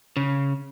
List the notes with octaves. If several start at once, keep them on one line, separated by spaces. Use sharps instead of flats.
C#3